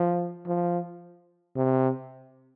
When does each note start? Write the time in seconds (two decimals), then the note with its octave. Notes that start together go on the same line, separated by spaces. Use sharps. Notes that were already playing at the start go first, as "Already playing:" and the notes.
Already playing: F3
0.46 F3
1.56 C3